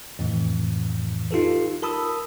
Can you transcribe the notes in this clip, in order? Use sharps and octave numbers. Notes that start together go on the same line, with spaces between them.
F2 A2 E3
D#4 F4 G4 A4 B4
A#4 A5 B5 D#6 E6